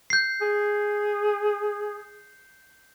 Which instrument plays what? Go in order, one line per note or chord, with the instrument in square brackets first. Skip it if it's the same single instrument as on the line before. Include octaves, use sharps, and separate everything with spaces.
[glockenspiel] G6 C7
[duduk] G#4